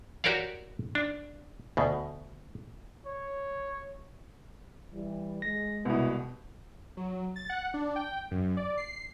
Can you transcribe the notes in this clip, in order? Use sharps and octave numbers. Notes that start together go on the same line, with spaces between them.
F#4 G4 A#4 C#5 D5 F5
D4
D2 B2
C#5
E3 G3
G#3 A#6
C2 B2 B3 E4
F#3
A6
F#5
D4
G5
F#2
D5
C7